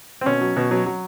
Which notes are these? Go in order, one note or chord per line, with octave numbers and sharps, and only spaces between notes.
C4
B2 C#4
F#3
B2
F#3
F#3